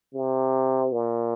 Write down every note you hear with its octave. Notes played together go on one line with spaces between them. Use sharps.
C3
A#2